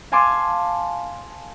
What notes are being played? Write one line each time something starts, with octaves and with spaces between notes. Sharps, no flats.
F5 G#5 A5 C6 D6